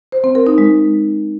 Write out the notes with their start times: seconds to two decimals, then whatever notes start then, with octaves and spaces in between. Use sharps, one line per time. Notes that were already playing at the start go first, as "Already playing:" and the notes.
0.12 C5
0.24 C4
0.35 A#4
0.47 D#4
0.58 G#3